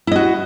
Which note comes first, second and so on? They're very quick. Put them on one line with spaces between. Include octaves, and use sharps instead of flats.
E4 D#5 F#4